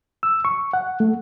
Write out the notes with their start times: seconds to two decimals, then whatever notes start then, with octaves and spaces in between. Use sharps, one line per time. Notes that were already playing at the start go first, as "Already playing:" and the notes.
0.23 E6
0.45 C#6
0.73 F#5
1.00 A3